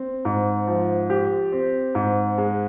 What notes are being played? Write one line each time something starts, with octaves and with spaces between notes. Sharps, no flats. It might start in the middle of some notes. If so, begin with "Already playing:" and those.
Already playing: C4
G#2
F3
G4
C4
G#2
G#3